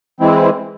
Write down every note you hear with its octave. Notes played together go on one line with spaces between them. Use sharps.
E3 G#3 C4 E4